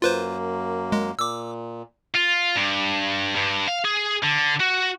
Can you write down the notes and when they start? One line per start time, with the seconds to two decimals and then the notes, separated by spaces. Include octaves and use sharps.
0.02 F#2 A#3 F4 B4 C5
0.92 G#3
1.19 A#2 D6 E6
2.15 F4
2.56 G2
3.36 G2
3.68 F5
3.85 G#4
4.23 D3
4.60 F#4